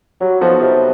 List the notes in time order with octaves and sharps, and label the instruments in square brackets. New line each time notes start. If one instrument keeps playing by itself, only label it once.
[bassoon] F#3 [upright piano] G3
[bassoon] F3 [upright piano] B3 D#4 F#4 A4
[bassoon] C3 [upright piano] G3